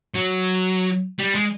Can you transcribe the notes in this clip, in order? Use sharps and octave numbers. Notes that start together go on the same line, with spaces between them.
F#3
G3
G#3